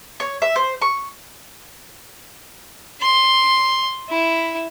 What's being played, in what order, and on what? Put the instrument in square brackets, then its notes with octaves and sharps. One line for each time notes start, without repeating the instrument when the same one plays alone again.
[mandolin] C#5
E5
C5
C#6
[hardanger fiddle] C6
E4